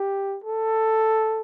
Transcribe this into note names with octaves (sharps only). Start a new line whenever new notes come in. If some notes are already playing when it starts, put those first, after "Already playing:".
Already playing: G4
A4